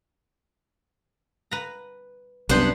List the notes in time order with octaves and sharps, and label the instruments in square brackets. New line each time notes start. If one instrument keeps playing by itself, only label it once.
[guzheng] B4 A#5
[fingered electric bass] C2 F#2 [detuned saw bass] C3 [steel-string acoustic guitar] B3 D4 [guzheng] B4 C5